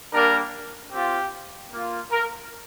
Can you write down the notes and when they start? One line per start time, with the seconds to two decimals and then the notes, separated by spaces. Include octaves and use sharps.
0.12 G3 A#3 D4 A#4
0.91 C4 F4 G4
1.71 A#3 F4
2.11 A#4